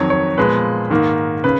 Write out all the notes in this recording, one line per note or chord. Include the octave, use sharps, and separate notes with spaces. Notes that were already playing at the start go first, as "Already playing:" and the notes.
Already playing: F2 D#3 F#3 C#5
C#5
A#2 F3 G#3 B3 B4
G#2 D#3 A#3
C#3 B4